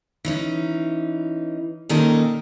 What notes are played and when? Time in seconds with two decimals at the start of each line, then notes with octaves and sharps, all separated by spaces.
0.25 E3 C#4 D#4
1.89 A#2 D#3 C#4 D#4 A4 A#4